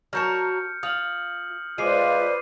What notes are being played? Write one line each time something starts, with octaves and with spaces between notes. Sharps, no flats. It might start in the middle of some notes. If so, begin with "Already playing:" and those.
F#3 A#4 A5 F6 G6 C#7
F4 D#6 F6 F#7
G#3 F4 B4 C5 D5 D6 C7 D#7